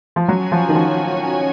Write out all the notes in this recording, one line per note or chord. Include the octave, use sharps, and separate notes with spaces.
F3
F#3 C#4 F#4 C#5 G#5
F3
D#3
F3